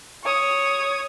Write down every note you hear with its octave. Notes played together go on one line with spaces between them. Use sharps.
C#5 D#6